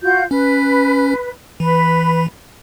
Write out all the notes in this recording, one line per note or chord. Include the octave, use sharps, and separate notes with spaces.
F4 F#4 G6
C#4 B4
E3 B4 B5